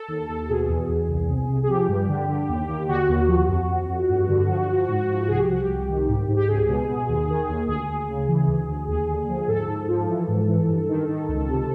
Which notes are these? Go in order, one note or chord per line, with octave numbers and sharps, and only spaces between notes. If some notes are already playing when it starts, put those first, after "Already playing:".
Already playing: A4
D#2
D#2
B2 G#4
E2
E2
C2
C2
C2
G#4
F3 G4
G2
D3
D3
D#2
D#2
D3 F#4
D#2
F3
F2
F2
F2
G2
D3
F3
F3
G#2
F3
C2 G#4
G4
C2 F#4
G4
C2
D#3
G#2
G#2
G4
C#2 G#4
B2
B2
D#2
D#3
D#2
D2 G#4
D2
C#3
E3
D2
D2
D#2 G#4
D3
F3
G#2 A4
G#2
F3
E3
G#2
E3
G2
D#3
D#3
C#2
C3